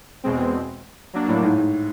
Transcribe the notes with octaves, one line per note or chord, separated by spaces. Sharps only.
E2 B2 G#3 C4
F#3 A#3 D4
A2
G#2
G#2